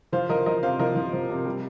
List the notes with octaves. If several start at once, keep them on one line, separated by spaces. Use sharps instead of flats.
F3 C5 F5
F3 A#4 D#5
F3 A#4 D#5
C3 C5 F5
F3 A#4 D#5
F3
F3
C3
G3